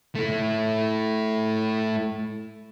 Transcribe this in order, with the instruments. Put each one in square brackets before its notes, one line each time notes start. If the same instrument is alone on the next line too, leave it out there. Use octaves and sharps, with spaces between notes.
[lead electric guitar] A3 E4